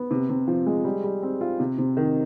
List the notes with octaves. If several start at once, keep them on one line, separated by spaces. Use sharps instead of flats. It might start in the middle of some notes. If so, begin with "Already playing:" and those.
Already playing: B3
C3
C3
F3
G#3
G3
G3
C4
F4
C3
C3
D#3